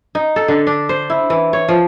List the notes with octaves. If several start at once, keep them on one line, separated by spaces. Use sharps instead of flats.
D#4
A4
D3
D4
C5
E4
E3
C#5
F3